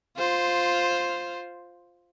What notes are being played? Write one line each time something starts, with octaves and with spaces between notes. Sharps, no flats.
F4 C5